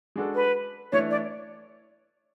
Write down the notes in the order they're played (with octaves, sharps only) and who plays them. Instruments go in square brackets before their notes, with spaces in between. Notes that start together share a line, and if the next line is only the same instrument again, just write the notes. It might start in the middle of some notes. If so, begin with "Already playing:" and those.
[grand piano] G#3 D4 F#4 A4
[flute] B4
[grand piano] E3 A3 D4 [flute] C#5
[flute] D5